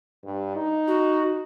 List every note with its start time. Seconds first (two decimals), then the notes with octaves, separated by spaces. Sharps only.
0.24 G2
0.56 D#4
0.87 F#4